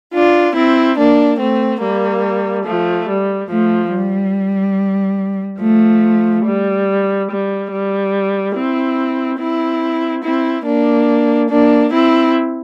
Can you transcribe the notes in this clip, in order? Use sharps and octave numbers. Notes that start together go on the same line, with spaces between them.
D4 F4
C4 E4
A#3 D4
A3 C4
G3 A#3
F3 A3
G3
F3 A3
G3
F3 A3
G3
G3
G3
C4 E4
C4 E4
C4 E4
A#3 D4
A#3 D4
C4 E4